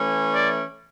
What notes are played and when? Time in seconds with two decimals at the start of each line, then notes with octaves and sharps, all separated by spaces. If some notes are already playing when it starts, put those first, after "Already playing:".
Already playing: E3 A3 C#4
0.34 D5